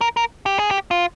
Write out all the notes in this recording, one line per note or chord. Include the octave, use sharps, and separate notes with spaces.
A#4
A#4
G4
G#4
G4
F4